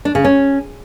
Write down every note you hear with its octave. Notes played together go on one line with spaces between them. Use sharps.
D4
C#3
C#4